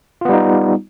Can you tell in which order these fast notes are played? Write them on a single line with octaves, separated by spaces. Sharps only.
F4 B3 G3 D#4